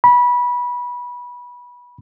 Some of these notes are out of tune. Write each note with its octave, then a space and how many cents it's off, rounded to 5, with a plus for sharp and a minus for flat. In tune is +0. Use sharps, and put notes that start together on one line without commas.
B5 -20